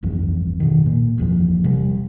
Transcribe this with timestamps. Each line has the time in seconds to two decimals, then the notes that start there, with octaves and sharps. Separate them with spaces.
0.03 G1 C2 F2 E3
0.60 B2 D#3
0.86 A#2
1.18 F#1 E2 A2 F3
1.64 C3 G3